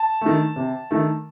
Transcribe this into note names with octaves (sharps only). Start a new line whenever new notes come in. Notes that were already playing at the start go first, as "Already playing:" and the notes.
Already playing: A5
D#3 A3
C3
D#3 A3